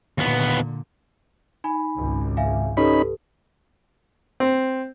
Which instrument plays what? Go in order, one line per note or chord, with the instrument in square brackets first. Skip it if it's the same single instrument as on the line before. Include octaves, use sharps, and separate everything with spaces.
[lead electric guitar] D#2 B3 [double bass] A#2 D3
[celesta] D#4 G#5 B5
[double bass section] G#1 C#2
[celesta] E5 F5 G#5
[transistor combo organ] C#4 D#4 B5 [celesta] G4 A4 B4
[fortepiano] C4